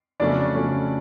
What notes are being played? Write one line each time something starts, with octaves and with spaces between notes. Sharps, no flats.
F2 C#3 F#3 A3 C#4 D4 D5
F2 C#3 F#3 A3 C#4